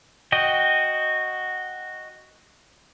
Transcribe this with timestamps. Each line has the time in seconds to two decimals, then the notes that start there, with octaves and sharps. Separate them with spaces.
0.32 F#4 D#5 G5